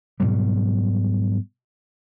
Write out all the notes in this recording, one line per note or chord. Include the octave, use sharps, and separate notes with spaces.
G#2 B2 F#3 G3